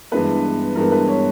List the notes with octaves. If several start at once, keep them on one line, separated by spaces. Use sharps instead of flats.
G2 E3 G#3 B3 B4
G2 E3 G#3 B3 A#4
B4
C#5